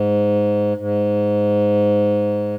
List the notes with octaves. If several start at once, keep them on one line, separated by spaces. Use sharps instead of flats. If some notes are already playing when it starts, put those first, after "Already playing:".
Already playing: G#2
G#2